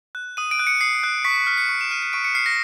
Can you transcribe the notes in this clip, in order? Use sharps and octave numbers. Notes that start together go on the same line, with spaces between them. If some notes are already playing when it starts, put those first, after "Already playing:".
F#6
D#6 D#7
D7
F#6
C#7
D#6 C7
F#6
C#6 B6
B6
F6 B6
C#7
C#6
E7
F6 D#7
C#7
C#6 D7
C#7
F6 C7
A#6